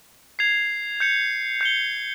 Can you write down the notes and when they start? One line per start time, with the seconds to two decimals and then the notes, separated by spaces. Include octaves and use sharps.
0.39 G#6 C7 F7
1.00 G6 C#7 F7
1.61 G6 C#7 G7